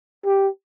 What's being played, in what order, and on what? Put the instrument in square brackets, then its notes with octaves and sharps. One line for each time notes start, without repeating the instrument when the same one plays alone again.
[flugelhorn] G4